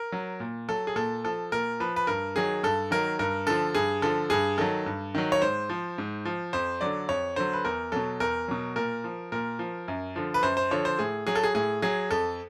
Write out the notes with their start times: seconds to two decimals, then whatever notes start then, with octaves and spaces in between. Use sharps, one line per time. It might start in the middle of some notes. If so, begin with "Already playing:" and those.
Already playing: A#4
0.12 F#3
0.40 A#2
0.69 F#3 A4
0.87 G#4
0.96 A#2 A4
1.24 F3 A4
1.52 A#2 A#4
1.80 F3 B4
1.96 B4
2.07 G2 A#4
2.36 D#3 F#3 G#4
2.63 G2 A4
2.91 D#3 F#3 A#4
3.19 G2 A#4
3.47 D3 F3 A4
3.75 G2 G#4
4.02 D3 F3 A4
4.30 G2 G#4
4.58 D#3 F#3 A4
4.86 G2
5.15 D#3 F#3
5.32 C#5
5.42 G#2 C5
5.69 F3
5.98 G#2
6.25 F3
6.53 F2 C5
6.81 D3 F#3 D5
7.09 F2 C#5
7.36 D3 F#3 C5
7.53 B4
7.65 E2 A#4
7.92 B2 F#3 A4
8.20 E2 A#4
8.48 B2 F#3
8.76 A#2 A#4
9.04 F3
9.32 A#2 A#4
9.59 F3
9.88 F#2
10.16 D3 F3
10.34 B4
10.43 F#2 C5
10.57 C5
10.71 D3 F3 C#5
10.85 C5
10.99 A2 G#4
11.27 F#3 G#4
11.35 A4
11.44 G#4
11.55 A2 G#4
11.82 F#3 G#4
12.11 F2 A4